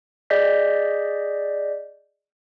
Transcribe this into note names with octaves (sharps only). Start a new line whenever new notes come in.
G#4 D5 D#5 G6 B6